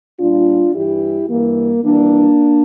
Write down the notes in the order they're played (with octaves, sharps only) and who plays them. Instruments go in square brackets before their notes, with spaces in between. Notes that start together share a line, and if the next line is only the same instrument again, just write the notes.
[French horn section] A#2 G3 D4 F4
G2 E3 G3 E4 G4
G2 E3 G3 A#3
F2 E3 G3 A#3 D4